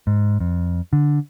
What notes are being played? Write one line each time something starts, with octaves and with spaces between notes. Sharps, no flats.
G#2
F2
D3